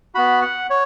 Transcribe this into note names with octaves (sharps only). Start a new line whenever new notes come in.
B3 F#4 B5
F#5
C#5